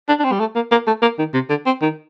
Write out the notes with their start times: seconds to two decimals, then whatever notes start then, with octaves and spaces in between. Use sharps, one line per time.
0.08 D4
0.19 D4
0.24 C4
0.32 G3
0.40 A3
0.55 A#3
0.71 A#3
0.87 A3
1.02 A#3
1.18 D#3
1.34 C3
1.50 D3
1.66 C4
1.82 D#3